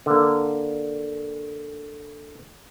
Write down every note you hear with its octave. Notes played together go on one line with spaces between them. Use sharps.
D3 A#3